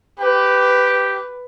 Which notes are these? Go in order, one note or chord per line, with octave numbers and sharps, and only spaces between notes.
G4 B4